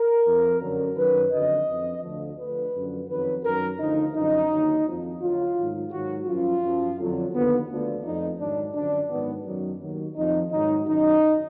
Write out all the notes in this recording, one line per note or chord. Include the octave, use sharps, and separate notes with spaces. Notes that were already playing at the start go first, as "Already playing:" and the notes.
Already playing: A#4
F2 F3
F#2 D3 F#3
F#2 D#3 F#3 B4
F2 D3 F#3 D#5
F2 F3
D2 D3 F3
D2 D3 F3 B4
F#2 D3 F3
F2 D#3 F#3 B4
F#2 D#3 F#3 A#4
D2 D3 F3 D#4
F#2 D3 F3 D#4
D#2 D3 F#3
F2 F3
D2 D3 F#3 F4
G#2 D#3 F#3
G#2 D#3 F#3 F#4
F#2 F3 F4
F#2 F3
F2 D3 F#3
D#2 D3 F3 B3
D2 D3 F3
F2 F3 D#4
G#2 D#3 F#3 D4
F#2 D3 F3 D4
G#2 D#3 F#3 B3
F#2 D#3 F#3
D#2 D#3 F#3
F2 F3 D#4
G#2 D#3 F#3 D#4
F#2 D#3 F#3 D#4